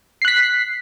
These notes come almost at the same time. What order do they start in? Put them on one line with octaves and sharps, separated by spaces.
C7 F#6 B6